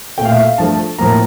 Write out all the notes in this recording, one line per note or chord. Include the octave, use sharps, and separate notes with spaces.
A#2 A3 G5
F5
E5
F5
G2 F3 A3 A5
A2 F3 A#3 A#5